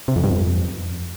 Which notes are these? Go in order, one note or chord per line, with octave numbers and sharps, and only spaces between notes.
C3
F2
G2
F2